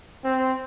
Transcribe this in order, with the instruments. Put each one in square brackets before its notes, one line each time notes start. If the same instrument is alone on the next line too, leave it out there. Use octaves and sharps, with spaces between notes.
[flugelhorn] C4